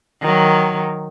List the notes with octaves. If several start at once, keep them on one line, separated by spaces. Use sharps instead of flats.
D#3 F#3